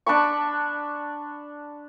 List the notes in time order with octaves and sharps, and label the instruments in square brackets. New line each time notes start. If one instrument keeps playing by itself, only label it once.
[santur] D4 A5 B5 C#6